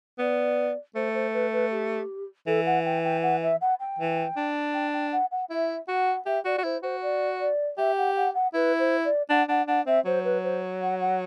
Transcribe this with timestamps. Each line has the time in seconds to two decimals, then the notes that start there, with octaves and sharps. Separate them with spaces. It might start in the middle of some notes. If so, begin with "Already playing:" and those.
0.19 B3 D5
0.95 A3 C5
1.14 C5
1.33 B4
1.52 B4
1.71 G4
2.47 E3 A4
2.66 F#5
2.85 G5
3.04 G5
3.22 F#5
3.42 E5
3.61 F#5
3.80 G5
3.99 E3
4.37 D4
4.74 G5
4.93 G5
5.12 F#5
5.31 F#5
5.50 E4 E5
5.88 F#4 F#5
6.26 G4 E5
6.45 F#4 D5
6.58 F#4
6.64 E4 C5
6.83 F#4 C5
7.02 D5
7.40 D5
7.78 G4 E5
7.97 F#5
8.16 F#5
8.34 F#5
8.54 E4 B4
8.79 C5
9.05 D5
9.30 D4 F#5
9.49 D4 F#5
9.68 D4 F#5
9.86 C4 E5
10.05 F#3 C5
10.24 B4
10.44 C5
10.81 F#5
11.00 F#5